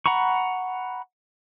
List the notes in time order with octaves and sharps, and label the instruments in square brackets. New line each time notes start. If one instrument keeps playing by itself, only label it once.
[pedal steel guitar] F#5 A#5 B5 C#6